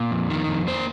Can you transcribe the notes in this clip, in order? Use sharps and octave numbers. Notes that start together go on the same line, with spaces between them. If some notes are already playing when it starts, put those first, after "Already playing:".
Already playing: A#2
F2
D#3
F2
A#3 C5